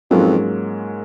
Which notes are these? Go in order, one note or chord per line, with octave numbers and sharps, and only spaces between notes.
F2 G#2 F#3 A#3 C#4 F4